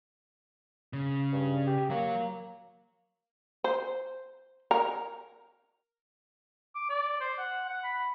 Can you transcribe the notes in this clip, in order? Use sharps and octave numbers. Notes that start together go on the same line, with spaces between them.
C#3
G2
G4
F#3 A#3 C#5
C5
A#4
D6
D5
C5
F#5
F#5
B5